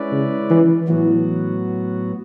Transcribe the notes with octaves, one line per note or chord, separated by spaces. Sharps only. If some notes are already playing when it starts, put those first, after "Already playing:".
Already playing: G#3 C#4 E4 B4 D5
C#3
E3
A2 E3 F#3 B3 F#4